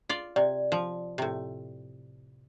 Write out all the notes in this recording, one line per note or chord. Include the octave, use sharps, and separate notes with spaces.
F4 D5
C3 D5
F3
A2 C3